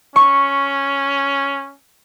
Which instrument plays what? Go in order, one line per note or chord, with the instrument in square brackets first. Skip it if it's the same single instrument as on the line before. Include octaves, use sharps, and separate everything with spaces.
[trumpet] C#4 [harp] C#6